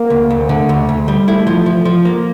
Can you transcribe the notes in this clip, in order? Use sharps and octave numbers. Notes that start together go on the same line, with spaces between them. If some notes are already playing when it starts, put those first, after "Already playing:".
Already playing: A#3
D2
D2
D3 A3
D2
D2
G3
A3 E4
F3
F3
F3
A#3